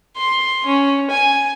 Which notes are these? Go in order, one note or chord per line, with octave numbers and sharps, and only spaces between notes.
C6
C#4
G#5